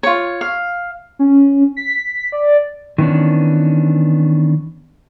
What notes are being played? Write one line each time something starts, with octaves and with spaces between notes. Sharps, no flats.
F4 C#5
F5
C#4
B6
D5
D#3 E3 B3 C#4 D4